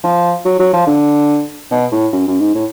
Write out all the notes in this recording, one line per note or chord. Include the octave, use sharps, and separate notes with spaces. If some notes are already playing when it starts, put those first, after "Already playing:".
F3
F#3
F#3
F3
D3
B2
A2
F#2
F#2
G#2
A2